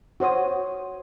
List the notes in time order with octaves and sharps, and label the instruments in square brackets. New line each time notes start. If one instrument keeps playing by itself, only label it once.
[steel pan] F#4 C5 C#5 D#6